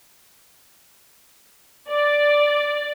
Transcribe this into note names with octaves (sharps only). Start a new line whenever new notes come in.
D5